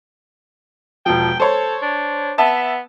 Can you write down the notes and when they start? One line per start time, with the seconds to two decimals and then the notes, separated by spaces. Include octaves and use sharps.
1.06 E1 F3 G5
1.40 A4 C5 C#5
1.82 D4
2.38 B3 E5 A5